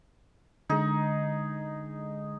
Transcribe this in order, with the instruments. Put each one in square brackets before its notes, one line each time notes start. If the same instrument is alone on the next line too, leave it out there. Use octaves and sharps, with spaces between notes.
[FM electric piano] D3 G#3 [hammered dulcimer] D#4 G#4